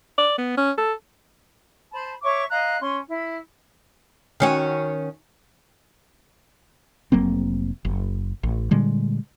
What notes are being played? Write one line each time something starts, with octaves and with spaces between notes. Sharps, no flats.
D5
B3
C#4
A4
C5 A5 B5
C#5 E5 C#6 D6
D#5 F5 A#5 F#6
C#4 C6
E4
D#3 C#4 F#4
F1 F#3 A#3 C4
F#1
A1
A#2 D3 G3 G#3